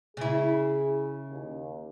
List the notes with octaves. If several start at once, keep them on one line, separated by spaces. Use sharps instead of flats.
C#3 E4 G#4
D#2